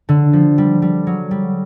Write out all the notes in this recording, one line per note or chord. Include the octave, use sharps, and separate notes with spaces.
D3
F3
G3
G3
F#3
G3